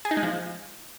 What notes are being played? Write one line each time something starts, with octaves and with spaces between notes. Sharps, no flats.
G#4
D#4
G#3
F3